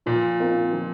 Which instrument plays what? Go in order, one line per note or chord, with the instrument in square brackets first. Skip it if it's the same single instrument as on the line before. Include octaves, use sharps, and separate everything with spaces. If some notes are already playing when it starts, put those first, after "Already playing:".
[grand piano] A#2 [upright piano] F3
[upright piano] C4 F4 A#4
F3